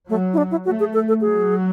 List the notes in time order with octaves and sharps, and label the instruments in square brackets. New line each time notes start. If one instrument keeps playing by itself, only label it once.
[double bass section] F#3 [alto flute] A3
[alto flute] E4
D4
E4
[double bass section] A3 [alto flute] F#4
[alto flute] G#4
A4
A4
[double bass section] F#3 [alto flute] G#4